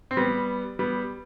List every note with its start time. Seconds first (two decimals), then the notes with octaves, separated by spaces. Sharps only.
0.11 C4
0.17 G3 B3
0.79 G3 B3